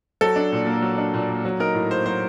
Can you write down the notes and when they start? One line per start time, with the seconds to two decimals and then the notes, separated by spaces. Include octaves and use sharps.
0.21 F#3 A4
0.36 D4
0.52 A#2
0.67 A#3
0.82 F#3
0.98 D4
1.14 A#2
1.29 A#3
1.45 F#3
1.60 D#4 A#4
1.75 A2
1.90 A#3 C5
2.06 F#3 C5